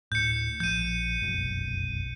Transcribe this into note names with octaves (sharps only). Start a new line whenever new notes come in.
D1 A2 G6 C#7
A#1 F3 G6 D#7
F1 B1 F#2